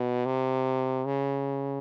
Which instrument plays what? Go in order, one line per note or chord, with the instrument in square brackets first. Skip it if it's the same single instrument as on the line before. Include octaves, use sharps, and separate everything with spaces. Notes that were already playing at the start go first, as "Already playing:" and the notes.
Already playing: [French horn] B2
C3
C#3